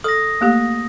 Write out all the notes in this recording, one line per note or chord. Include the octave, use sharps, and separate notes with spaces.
A4 D#6 A#6
A3 A#3 G4